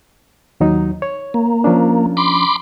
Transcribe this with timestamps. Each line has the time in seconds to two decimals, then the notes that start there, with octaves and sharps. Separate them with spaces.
0.60 D#2 F#3 D#4
1.02 C#5
1.34 A#3
1.64 F3 C#4 D4
2.17 B5 C6 D6